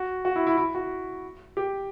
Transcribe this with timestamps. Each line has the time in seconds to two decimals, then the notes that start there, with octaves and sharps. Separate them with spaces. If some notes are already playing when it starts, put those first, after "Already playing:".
Already playing: F#4
0.25 F#4
0.36 E4
0.47 E4
0.57 E4
0.75 F#4
1.57 G4